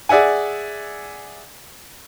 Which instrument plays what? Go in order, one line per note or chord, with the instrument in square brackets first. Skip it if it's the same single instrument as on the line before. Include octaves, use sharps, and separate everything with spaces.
[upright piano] G#4 D5 E5 F#5 G#5